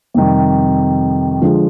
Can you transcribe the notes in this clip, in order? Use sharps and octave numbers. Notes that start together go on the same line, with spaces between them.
F2 C3 D#3 G3
D3 F3 G#3